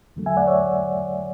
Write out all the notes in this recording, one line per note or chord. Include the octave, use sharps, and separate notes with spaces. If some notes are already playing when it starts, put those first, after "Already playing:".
E2 D3 F#3 A3
E5 G#5
D5 F#5
C#5 E5